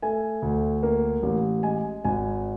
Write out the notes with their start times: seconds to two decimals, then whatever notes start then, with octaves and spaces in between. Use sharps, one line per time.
0.02 A3 G#5
0.42 D2
0.83 A#3
1.23 A1
1.63 G#3 G#5
2.05 G#1 G#5